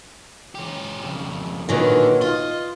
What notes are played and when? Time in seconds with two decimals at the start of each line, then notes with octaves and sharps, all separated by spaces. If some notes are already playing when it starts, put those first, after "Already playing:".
0.55 C#4 G4
1.03 F2 C#3
1.69 A#2 D3 D#3 F#3 B4 G#5
2.21 F4 D#5